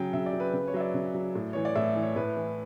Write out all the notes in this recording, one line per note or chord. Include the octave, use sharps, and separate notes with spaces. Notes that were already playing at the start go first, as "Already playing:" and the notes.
Already playing: C#3 F#3 G5
C#3 E5
D5
F#3
B4
C#3 B4
C#5
F#3 E5
D5
C#3
F#3
A2
E3 C#5
D5
A2 E5
E3
C#5
A2 B4
E3